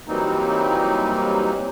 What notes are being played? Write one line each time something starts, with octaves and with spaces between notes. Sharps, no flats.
E3 F#3 G3 A#3 C4 D#4